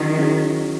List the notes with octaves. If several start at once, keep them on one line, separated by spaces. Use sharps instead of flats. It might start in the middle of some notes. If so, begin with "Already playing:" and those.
Already playing: D#3 F#3 C#4 E4 G#4
F#3 C#4 E4 G#4